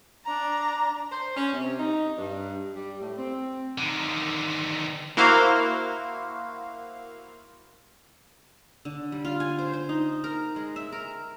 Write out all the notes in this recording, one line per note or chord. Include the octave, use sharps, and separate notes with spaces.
D4 A#5
C5
C#4
C3
D#4
G2
G3
A2
C4
D3 D#3
A#3 E4 F#4 C5 F5
D3
G3
F4
G#5
C5
C5
D#4
A#4
G#3
E5
A#4